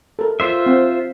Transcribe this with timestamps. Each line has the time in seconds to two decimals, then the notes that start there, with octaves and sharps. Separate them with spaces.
0.19 A4 A#4
0.40 F4 C5 E5
0.66 C4